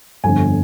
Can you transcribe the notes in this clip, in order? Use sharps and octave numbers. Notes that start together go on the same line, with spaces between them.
G1 F2 D3 G#5